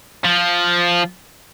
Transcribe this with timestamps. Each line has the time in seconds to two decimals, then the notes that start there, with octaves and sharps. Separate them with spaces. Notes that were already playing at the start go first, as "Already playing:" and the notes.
0.24 F3